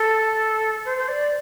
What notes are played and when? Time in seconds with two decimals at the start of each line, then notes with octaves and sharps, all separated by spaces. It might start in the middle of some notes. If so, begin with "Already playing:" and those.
Already playing: A4
0.85 C5
0.98 C5
1.08 D5